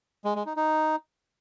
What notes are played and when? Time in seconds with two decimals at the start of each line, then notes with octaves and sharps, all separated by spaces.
0.25 G#3
0.35 G#3
0.46 D#4
0.56 D#4